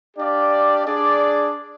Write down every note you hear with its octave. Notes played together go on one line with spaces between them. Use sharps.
D4 G4 D5 F5
D4 G#4 D5